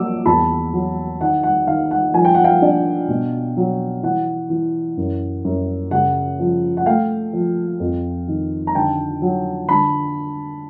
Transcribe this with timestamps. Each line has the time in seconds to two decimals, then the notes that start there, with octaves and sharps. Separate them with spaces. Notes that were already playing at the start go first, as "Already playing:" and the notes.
Already playing: F#3 A#3 D6 E6
0.26 E2 A5 B5
0.73 F#3
1.21 D#3 F#5
1.43 F#5
1.67 D#3 F5
1.91 F#5
2.14 F3 G#5
2.25 G5
2.35 F#5
2.44 F5 G5
2.62 D4
3.08 B2
3.57 F#3
4.03 E3 F#5
4.50 E3
4.97 F#2
5.45 F#2
5.91 C#3 F#5
6.40 F3
6.77 F#5
6.86 A3 F5 G5
7.33 F3
7.80 F2
8.28 D#3
8.67 A#5
8.75 D3 G5 A5
9.22 F#3
9.69 D3 A5 B5